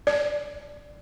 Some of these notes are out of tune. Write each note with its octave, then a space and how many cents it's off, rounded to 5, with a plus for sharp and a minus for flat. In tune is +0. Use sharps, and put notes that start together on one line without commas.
D5 +0